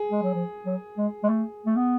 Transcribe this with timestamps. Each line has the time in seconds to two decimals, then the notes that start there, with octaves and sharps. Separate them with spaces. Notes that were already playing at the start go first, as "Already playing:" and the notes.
Already playing: G#4
0.11 G#3
0.22 F#3
0.34 F3
0.66 F#3
0.97 G#3
1.23 G#3
1.29 A3
1.66 A3
1.76 B3